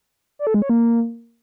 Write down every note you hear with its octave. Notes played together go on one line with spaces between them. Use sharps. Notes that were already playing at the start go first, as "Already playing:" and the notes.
D5
A4
G#3
C#5
A#3